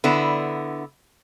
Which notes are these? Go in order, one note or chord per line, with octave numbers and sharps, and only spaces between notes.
D3 B3 E4